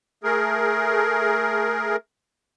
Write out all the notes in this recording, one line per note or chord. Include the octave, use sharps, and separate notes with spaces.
A3 G#4 A#4